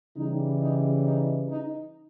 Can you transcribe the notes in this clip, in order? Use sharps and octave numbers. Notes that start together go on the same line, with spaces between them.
C#3 E3 G3 D#4
D#4
D#4
D#4